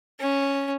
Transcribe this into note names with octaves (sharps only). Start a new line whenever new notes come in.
C#4